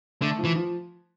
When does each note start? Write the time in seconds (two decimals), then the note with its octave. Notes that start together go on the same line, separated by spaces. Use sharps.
0.21 D3 A3
0.39 F3
0.45 E3
0.56 F3